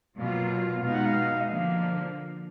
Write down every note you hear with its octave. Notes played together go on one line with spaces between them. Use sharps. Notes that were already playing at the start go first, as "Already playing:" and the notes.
B2 F#3 A#3 F4 F5
B2 G#3 B3 D#4 F5
F#5
F5
D#5
D3 F3 A#3 F5